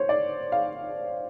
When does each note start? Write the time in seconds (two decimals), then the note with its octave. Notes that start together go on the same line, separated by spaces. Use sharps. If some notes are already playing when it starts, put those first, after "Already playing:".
Already playing: C5 C#5
0.09 D5
0.52 F5